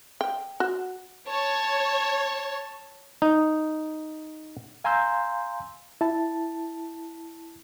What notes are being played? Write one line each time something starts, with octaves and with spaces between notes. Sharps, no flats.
G5
F#4
C#5 A5
D#4
F5 G#5 A#5 C6 E6 G6
E4 A5